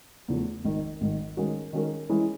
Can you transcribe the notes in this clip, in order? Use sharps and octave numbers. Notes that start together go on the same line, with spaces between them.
E2 C#3 F3 A3
G#1 G#2 D#3
G#1 G#2 D#3
D#3 G#3 C#4 F#4 A#4
D#3 G#3 C#4 F#4 A#4
E3 G#3 C#4 E4